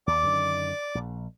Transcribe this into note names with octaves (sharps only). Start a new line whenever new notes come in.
D#2 D5 D6
F#2 D3 D#3
A#1